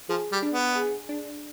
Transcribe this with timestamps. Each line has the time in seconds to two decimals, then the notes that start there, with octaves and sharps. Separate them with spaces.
0.09 F3 G#4
0.32 G3
0.42 D4
0.53 B3
0.75 G#4
1.09 D4